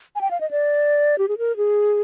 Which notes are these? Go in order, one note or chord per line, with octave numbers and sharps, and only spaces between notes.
G#5
G5
F5
D#5
D5
G4
G#4
A#4
G#4